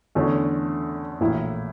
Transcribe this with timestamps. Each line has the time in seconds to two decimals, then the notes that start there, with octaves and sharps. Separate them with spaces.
0.15 E2 D3 A3 C#4
1.20 A#1 A2 E3 A#3 E4